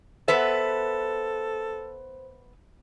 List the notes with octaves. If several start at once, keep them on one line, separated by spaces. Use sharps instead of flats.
B3 A4 B4 C5 E5